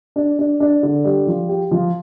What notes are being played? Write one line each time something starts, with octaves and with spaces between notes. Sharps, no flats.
D4
D4
D4
D3
G3
F3
G4
F3